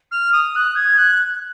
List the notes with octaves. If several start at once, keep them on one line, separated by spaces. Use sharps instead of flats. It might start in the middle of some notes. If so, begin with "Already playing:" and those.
F6
D#6
F#6
G#6
F#6